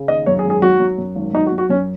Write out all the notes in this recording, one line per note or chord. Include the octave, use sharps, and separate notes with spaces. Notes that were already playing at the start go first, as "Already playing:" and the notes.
Already playing: C#3
D#2 D#5
F#2 C#5
G#4
G#1
G#4
F#3 F#4
F#3
F#2
G#1
F#3 D#4
F#4
F#3
F#4
F#2 C#4